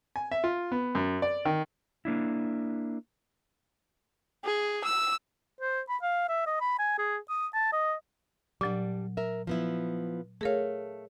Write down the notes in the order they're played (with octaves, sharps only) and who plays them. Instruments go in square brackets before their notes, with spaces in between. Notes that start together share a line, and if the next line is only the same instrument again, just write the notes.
[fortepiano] G#5
E5
F4
B3
F#2
D5
D#3
[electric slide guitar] A#3 D4 E4
[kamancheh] G#4
E6
[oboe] C5
B5
F5
E5
D#5
B5
G#5
G#4
D#6
A5
D#5
[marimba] A#2 F#3 [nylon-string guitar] G3 D4
[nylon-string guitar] A#4 E5
F3 B3 E4
[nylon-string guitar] A3 F5 [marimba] G#4 A#4 C#5